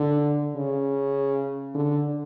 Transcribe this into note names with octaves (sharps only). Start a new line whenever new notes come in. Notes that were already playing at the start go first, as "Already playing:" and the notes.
Already playing: D3
C#3
D3